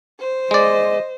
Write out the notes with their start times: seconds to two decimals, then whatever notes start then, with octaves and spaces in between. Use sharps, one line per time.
0.20 C5
0.51 G#3 D5 D#5